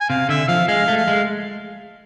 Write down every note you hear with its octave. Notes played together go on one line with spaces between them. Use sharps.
G#5
C3 F5
D3 E5
F3 F5
G#3 F5
A3
F5
G#3